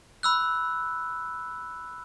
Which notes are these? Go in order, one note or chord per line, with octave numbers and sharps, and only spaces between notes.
B5 E6 F#6